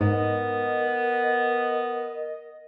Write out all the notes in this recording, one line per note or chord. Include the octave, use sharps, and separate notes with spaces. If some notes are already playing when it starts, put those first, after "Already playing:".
G#2 B3 A#4 D#5